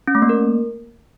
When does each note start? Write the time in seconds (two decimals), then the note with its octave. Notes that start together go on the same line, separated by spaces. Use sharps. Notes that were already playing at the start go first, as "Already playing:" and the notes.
0.07 C#4
0.15 A3
0.22 A#3
0.29 A#4